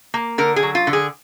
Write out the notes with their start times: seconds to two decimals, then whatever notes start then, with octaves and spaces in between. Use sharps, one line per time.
0.14 A#3
0.38 D3 A#4
0.56 G#4
0.63 F#3
0.75 F4
0.87 D3
0.93 G#4